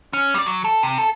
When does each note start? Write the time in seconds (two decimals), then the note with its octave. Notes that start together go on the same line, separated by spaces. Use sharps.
0.13 C#4
0.34 G3 D5
0.46 F#3
0.65 A4
0.83 C3
0.98 A4